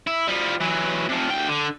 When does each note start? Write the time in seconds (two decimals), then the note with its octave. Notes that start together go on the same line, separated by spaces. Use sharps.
0.07 E4
0.28 F3 G3
0.61 E3 F#3
1.09 C3 F3
1.30 D2 G5
1.48 D3